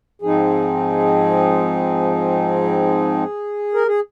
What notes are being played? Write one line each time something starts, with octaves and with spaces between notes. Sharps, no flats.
G#2 F3 C4 D#4 G#4
A#4
G#4